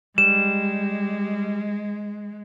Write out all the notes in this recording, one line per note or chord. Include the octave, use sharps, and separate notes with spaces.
G3 G#3 E7